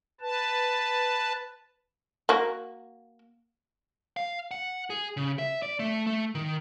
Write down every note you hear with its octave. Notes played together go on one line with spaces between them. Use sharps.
B4 A5
A#3 F#4
F5
F#5
G#4
C#3
E5
D5
A3
A3
D#3